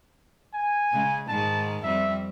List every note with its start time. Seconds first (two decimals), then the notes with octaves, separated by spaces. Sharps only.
0.54 G#5
0.93 C#3 G#3
1.29 G#2 D#3 G#3 A5
1.84 F2 G3 C4 E5